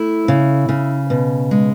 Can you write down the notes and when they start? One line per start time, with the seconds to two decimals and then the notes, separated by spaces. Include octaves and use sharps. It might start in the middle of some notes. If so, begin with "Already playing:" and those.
Already playing: A3 E4
0.28 C#3
0.69 C#3
1.10 B2
1.51 G#3